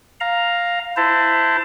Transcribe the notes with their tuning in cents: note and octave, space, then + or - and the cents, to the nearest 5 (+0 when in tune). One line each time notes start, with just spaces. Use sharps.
F5 +5 A#5 +0
E4 +5 C5 -20 A5 +20